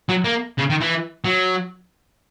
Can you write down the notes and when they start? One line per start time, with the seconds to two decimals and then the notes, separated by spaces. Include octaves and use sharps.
0.09 F#3
0.24 A#3
0.58 C#3
0.70 D#3
0.80 E3
1.25 F#3